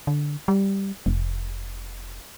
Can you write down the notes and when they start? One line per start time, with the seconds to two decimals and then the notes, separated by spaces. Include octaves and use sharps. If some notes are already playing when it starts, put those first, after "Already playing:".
0.07 D3
0.48 G3
1.06 F1